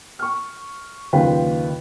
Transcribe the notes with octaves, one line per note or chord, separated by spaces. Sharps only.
C#6 F6
F#1 D#2 F4 B4 G5